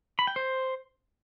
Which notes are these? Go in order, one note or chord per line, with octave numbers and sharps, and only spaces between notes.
B5
G5
C5